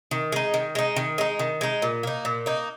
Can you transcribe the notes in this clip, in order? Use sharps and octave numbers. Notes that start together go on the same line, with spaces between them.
D#3
G#3 D#4
D#3
G#3 D#4
D#3
G#3 D#4
D#3
G#3 D#4
A#2
A#3 D#4
A#2
A#3 D#4